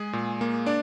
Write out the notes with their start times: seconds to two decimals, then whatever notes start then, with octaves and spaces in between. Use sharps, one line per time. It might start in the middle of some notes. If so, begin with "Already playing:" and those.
Already playing: G#3 G#4
0.13 A#2
0.41 A#3
0.66 D4 D5